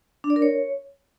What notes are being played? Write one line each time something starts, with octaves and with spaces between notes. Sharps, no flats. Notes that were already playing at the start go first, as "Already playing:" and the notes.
D4
D5
A#4
C#5